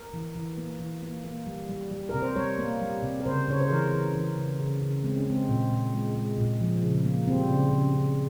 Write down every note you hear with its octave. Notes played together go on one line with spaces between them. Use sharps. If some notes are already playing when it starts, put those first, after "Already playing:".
Already playing: A#4
E3
E3
A#3
E3
A#3
A#3
G3
G3
G3
C3 A#4
C5
G3 C#5
A#3
G3
C3
A#4
C#3 C5
C#3 C#5
C5
E3 A#4
E3
E3
C#3
C#3
C#3
G#3 C4
C#4
G#3 C4
A#2
A#2
G#3
G#3
A#2
F3
C#3
A#3
G3 C4
C#3
C#3
C#3